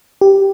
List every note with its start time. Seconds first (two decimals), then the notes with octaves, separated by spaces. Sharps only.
0.21 G4